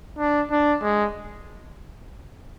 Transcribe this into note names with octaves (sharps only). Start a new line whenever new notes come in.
D4
D4
G#3